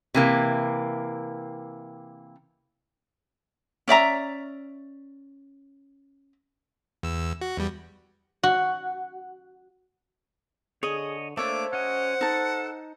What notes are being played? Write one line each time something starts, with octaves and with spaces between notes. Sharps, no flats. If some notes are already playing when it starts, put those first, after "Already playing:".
C3 E3 A#3
C#4 D5 E5 A#5
E2 E6
F#4
E2 G3
F#4
D3 G#4 C#5 D#5
A3 A#3 D4 A4 C5 C#5 E5 D6
C#4 F#4 D#5 F#5
D#4 A4 A5